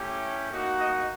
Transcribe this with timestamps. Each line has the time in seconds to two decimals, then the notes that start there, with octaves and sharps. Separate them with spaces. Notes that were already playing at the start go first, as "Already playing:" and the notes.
Already playing: A3 C#4 E4 G4
0.50 A#3 D#4 F#4
0.78 D#5